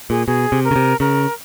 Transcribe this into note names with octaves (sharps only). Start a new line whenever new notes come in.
A#2 G#4
B2 G#4
C3
A#4
C#3
C3
C#3 A#4